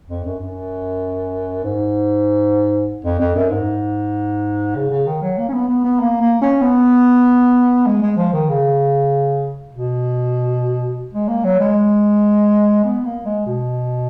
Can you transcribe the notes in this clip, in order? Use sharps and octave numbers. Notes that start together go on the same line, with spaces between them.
F2
F#2
F#2
G#2
F2
F2
F#2
G#2
C#3
C#3
D#3
F#3
A#3
C#4
B3
B3
B3
A#3
A#3
C#4
B3
G#3
G#3
F3
D#3
C#3
B2
G#3
A#3
F#3
G#3
B3
A#3
G#3
B2